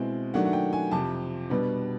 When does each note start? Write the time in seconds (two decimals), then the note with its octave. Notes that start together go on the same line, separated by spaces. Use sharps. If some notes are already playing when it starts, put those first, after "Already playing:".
Already playing: B2 G#3 C4 E4
0.34 D#3 F#3 A3 D4 F#5
0.45 F#5
0.53 G5
0.73 G#5
0.91 F2 C3 F3 A5
1.50 B2 G3 B3 D4